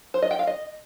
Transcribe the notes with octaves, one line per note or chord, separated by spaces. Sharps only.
C5
D#5
G5
F5
D#5